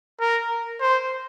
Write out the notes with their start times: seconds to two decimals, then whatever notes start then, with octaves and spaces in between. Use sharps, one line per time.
0.21 A#4
0.80 C5